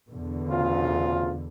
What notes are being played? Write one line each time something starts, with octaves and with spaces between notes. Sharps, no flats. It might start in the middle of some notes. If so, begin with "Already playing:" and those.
E2 B2 D3
D2 C#3 F4